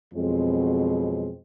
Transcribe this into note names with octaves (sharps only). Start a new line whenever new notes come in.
F2 B2 F#3 G#3 C4